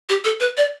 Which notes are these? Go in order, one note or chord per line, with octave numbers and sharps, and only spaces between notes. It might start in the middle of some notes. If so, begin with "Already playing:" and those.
G4
A4
B4
D5